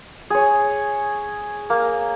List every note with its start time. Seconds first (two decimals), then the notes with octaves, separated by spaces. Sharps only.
0.30 G#4 C#5
1.70 A#3